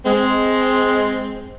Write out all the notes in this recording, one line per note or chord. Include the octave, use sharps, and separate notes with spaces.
G#3 C4